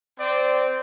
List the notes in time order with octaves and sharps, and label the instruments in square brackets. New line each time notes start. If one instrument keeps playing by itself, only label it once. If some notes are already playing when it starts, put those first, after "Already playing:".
[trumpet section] C4 D5